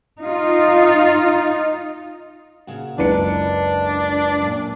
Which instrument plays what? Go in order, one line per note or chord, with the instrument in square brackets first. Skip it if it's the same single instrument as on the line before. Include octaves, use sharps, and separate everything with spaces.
[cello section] D#4 F4
[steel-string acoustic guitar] A#2 C#3 F#4
[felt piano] F#1 C#2 C#7 [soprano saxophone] D4 [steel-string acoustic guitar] B4 A#5
[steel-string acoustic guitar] F#2 A#2